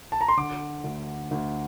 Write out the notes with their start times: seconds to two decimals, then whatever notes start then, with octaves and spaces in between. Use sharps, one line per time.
0.12 A5
0.21 A#5
0.28 C6
0.37 D3 D6
0.84 D2
1.31 D2